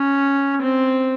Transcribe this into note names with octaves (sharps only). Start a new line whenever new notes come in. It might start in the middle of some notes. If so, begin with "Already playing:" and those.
Already playing: C#4
C4